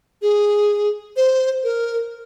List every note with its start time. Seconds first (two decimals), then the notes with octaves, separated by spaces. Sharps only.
0.22 G#4
1.17 C5
1.64 A#4